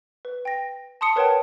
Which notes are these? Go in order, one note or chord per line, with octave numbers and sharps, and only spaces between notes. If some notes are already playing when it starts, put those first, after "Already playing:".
B4
G5 A#6
A5 C6 D#6 C#7
A#4 B4 C#5 F#5 G5 A5